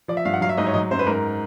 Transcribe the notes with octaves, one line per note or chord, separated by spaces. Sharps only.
F3 D5
E5
G2 F5
F#5
F#3 F5
E5
G#2 D#5
C#5
F#3 D#5
F#2 C5
B4
G#2 A#4